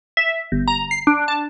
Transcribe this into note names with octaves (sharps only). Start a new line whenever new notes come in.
E5
G1
A#5
C7
D4
A5